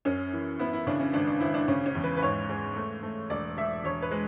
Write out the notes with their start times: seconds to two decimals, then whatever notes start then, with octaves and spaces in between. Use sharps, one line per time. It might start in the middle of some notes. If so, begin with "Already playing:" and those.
0.05 F#2 C#4
0.33 E3
0.59 B3 E4
0.73 E4
0.87 C#3 D4
1.00 C#4
1.13 G#1 D4
1.27 D4
1.40 G#1 E4
1.54 D4
1.68 C#3 C#4
1.86 C#4
1.95 E2
2.04 B4
2.17 B4
2.22 G#2 C#5
2.49 G#3
2.76 A3
3.03 A3
3.30 E1 D5
3.57 E1 E5
3.84 E1 C#5
4.02 B4
4.11 G#3